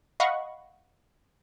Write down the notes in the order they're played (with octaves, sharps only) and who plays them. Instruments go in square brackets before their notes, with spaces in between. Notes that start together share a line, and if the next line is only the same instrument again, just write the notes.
[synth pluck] D#5 F5 F#5 B5 C#6